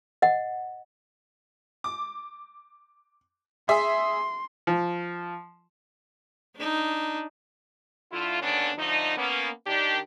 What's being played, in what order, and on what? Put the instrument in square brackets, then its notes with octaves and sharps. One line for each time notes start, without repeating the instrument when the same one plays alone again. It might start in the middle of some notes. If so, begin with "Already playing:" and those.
[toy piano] D#5 F#5
[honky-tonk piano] D6
[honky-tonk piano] G#4 E5 [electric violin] C6
[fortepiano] F3
[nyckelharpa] D4 D#4
[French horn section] D3 A3 E4 F4
D#2 D3 B3 C#4 D4
D3 F3 A3 D#4
A#3 B3 C#4
D#3 D4 G4